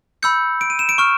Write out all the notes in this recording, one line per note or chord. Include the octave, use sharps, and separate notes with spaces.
B5 E6 G6 C#7
D7
D#7
E7
D7
C#6 F6